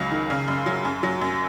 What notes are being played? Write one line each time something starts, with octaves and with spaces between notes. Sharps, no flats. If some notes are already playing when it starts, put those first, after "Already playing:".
Already playing: C#2 C#3 F#3
D#3
C#3
F#2
F#3
F#2
F#3
F#2